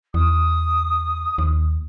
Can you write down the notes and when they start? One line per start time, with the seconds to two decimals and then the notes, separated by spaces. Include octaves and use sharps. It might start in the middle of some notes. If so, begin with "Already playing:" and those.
0.14 E2 D#6
1.38 D#2